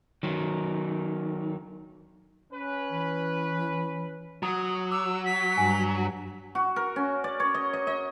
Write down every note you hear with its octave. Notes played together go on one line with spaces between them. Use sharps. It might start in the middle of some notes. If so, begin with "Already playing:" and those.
D#3 F#3
C#4 B4
E3
F#3 A#5 D#6
D6 E6
B6
G2 G#5
F#4
A#4
C#4
D5
C#5
D#5
D#5
D#5